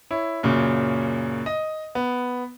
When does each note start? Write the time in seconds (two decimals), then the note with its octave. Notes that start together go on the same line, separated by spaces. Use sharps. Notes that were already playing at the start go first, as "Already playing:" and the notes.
0.11 E4 C#5
0.43 F#2 A#2 C#3
1.46 D#5
1.95 B3